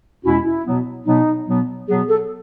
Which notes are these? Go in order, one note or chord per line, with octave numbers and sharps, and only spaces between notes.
E2 B2 G#3 C#4 E4 F#4
E4
B2 F#3 B3
B2 F#3 B3 D#4
B2 F#3 B3
B2 F#3 B3 G#4
A4